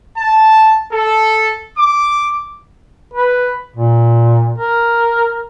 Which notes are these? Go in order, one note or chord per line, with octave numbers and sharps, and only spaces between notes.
A5
A4
D6
B4
A#2
A#4